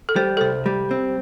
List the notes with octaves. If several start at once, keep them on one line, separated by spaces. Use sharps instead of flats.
A4
G3 C5
A4
C2 C5
G3
C4